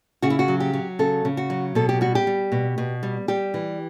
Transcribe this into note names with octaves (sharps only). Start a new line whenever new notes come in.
C#3 F#4
E4
F#4
F#3
G4
F#3
C#3 A4
C#3
F#4
F#3
B2 A4
G4
G3 F#4
G4
G3
B2
B2
G3
G3 G4
E3